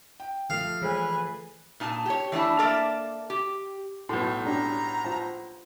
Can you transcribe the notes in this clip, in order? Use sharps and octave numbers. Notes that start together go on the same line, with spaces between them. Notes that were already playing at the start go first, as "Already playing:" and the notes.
G5
F3 A3 F5
E3 G#4 B4 G#5
A#2 D#4 G#5 A5
G4 C#5
E3 A3 D4 E4
A#3 A4 A#4 D5 E5
G4
B1 A2 A4 C6
C#4 D4 G4 A#5
F4 C5 A5